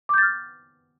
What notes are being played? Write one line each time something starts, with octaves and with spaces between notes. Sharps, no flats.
D6 F6 G6 A6